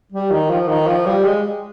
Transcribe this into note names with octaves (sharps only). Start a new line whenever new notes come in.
G3
D#3
F3
D#3
F3
G3
G#3